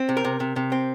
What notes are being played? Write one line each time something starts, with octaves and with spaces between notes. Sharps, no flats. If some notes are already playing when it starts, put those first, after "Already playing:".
Already playing: C4
C3
A#4
C3
C3
C3
C4